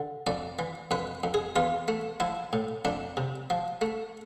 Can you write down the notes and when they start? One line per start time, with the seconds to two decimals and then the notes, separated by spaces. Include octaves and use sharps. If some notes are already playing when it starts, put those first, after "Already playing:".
Already playing: D3
0.27 F2 D5
0.59 E3
0.91 F2 B4
1.24 F2
1.34 G#4
1.56 E2 F4
1.88 A3
2.20 F3 E4
2.53 A2
2.85 F2 D4
3.17 C3
3.50 F3
3.81 A3